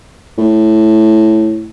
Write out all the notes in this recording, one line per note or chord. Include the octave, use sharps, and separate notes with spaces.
A2